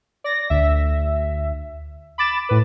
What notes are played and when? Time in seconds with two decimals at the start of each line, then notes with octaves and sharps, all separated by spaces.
0.24 D5 A#6
0.50 D2 E5
2.18 B5 D6 A6 E7
2.49 A2 B4